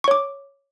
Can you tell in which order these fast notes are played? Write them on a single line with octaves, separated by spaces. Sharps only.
C#6 C#5 D6